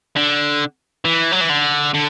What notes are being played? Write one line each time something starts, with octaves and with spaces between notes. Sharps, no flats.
D3
E3
F#3
E3
D3
D3